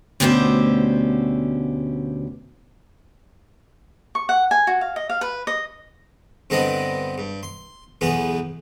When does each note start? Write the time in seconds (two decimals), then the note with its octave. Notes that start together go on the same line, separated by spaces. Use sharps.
0.20 D2 B2 C#4 G4 C5 E5
4.15 C#6
4.29 F#5
4.51 G#5
4.67 F#4
4.81 F5
4.96 D#5
5.09 F5
5.21 B4
5.47 D#5
6.50 G2 D3 B3 C4 D#5 B5
7.18 G2
7.43 C6
8.01 B1 E2 B3 G#4 B4